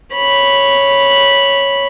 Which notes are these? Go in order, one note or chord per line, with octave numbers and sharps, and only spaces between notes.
C#5 B5